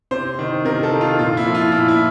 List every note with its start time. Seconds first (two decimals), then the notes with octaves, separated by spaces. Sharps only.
0.11 C3 C5
0.39 D#3
0.65 C3 A#4
0.83 A4
0.92 D#3
1.01 F4
1.18 A#2 F4
1.37 E4
1.46 F3
1.55 F4
1.72 A#2 E4
1.88 E4